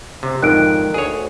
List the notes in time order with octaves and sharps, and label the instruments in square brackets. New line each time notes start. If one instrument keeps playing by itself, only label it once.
[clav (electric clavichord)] C3
[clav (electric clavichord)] F2 G#2 D3 [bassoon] D#3 [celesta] F#6 D7
[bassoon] D2 [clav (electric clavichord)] G#4 C#5